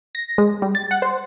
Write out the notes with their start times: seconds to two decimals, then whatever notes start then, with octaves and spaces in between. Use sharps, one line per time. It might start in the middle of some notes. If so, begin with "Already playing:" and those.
0.15 A#6
0.38 G#3
0.62 G3
0.75 A6
0.91 F#5
1.02 C5